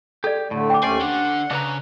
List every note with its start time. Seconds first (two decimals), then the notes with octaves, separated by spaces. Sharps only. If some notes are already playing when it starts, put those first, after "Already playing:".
0.24 G4 A4 D5
0.51 A2 D3 A3
0.70 G5 D6
0.83 D#2 A3 C#4 C5 D5 G#5
1.01 D3 D4 F#5
1.51 C#3 D4 B4 A#5